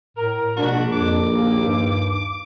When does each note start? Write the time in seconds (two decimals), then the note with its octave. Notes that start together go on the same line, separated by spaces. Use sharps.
0.17 A2 A#4
0.57 A#1 G#2 B2 D4 F#4
0.93 F2 D6
1.33 D#2 A#3
1.64 G2